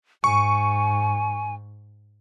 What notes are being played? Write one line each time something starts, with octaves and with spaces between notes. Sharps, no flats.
G#2 G#5 C#6